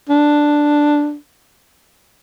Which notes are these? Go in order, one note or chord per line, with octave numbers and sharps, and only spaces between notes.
D4